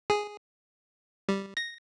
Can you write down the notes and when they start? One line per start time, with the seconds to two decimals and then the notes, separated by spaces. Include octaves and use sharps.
0.10 G#4
1.29 G3
1.57 A#6